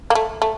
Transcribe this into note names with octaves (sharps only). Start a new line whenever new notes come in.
A#3
A3
A3